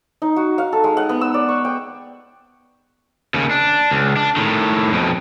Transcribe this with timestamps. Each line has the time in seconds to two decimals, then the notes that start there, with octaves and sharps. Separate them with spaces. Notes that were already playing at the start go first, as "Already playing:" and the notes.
0.22 D#4
0.36 F#4
0.58 F5
0.73 A4
0.84 G#3
0.97 F#5
1.09 B3
1.21 E6
1.34 D5
1.48 C#6
1.65 G5
3.34 D#2 C#3
3.51 D4
3.91 C#2
4.17 D4
4.37 A2 D#3
4.92 F2 B2